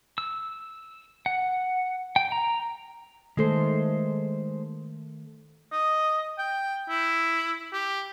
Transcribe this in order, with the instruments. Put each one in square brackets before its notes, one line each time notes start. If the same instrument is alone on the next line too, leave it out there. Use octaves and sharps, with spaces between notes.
[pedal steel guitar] E6
F#5
G5
A#5
[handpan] D#3 A3 A4 [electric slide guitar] G#3 C5
[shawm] D#5
G5
E4
G4